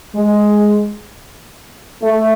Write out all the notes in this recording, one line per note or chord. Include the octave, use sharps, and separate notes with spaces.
G#3
A3